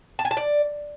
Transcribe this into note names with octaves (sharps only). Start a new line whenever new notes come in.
A5
G#5
A5
D5